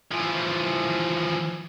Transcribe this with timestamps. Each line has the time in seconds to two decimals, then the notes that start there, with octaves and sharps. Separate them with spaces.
0.12 E3 F3